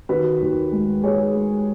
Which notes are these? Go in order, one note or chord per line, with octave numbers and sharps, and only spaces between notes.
D#3 F#4 B4
D#2
G#3
D#2 G#4 C#5
G#3